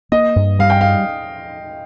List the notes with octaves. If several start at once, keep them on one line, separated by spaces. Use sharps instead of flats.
A#3 D#5
G2
G3 F5
G5
F5